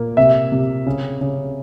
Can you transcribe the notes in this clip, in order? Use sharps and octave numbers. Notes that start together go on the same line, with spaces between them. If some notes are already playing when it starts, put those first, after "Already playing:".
Already playing: A#2 A#3
C3 E5
C3
C#3
C#3